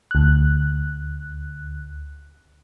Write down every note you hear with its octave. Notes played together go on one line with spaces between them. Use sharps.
D2 F#6